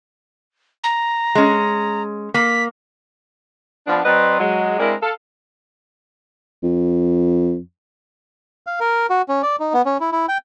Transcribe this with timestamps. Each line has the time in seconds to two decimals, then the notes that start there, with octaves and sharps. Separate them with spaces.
0.84 A#5
1.35 G#3 C#4
2.34 A#3 B6
3.87 F3 B3 D4
4.05 F#3 C4 B4 C5 D5 D#5
4.40 F#3 G#3
4.79 G#3 C4 D4 E4 A#4
5.02 A4 F5
6.63 F2
8.67 F5
8.80 A#4
9.10 F#4
9.29 C#4
9.43 D5
9.60 D#4
9.74 B3
9.86 C#4
10.00 E4
10.12 E4
10.29 G5